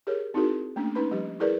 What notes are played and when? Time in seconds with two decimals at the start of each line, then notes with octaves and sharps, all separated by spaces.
0.07 G4 G#4 A#4 C#5
0.34 C4 D#4 E4 F#4 G#4 A#4
0.76 A3 A#3 C#4 D4
0.95 C#4 D#4 B4 B5
1.11 F3 G3 G4
1.40 E4 G#4 A#4 B4 D5